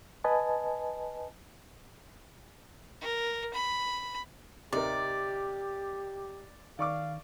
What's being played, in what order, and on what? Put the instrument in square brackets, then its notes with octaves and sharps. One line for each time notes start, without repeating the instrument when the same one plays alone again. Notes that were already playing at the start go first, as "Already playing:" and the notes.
[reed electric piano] B4 D#5 G#5 A5
[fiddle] A#4
B5
[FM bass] D1 [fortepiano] C3 D#4 A#4 [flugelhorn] G4 [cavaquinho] D5
[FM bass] D#3 [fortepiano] D5 C#6 D6 [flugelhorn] F5